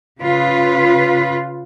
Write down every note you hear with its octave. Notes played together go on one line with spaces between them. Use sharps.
C#3 F4 B4